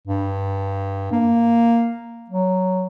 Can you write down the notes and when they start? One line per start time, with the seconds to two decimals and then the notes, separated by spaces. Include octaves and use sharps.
0.07 G2
1.12 A#3
2.30 F#3